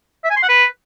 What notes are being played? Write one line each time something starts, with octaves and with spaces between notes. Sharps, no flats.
E5
G#5
C6
F#5
B4